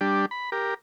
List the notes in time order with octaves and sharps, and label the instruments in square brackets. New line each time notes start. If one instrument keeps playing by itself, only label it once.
[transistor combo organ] G3 D4 G4
B5
G4 A#4